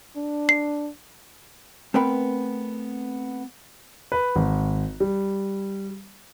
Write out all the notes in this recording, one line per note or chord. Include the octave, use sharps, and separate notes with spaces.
D4
C7
A3 B3 C4 A#4 B4
B4
G#1
G3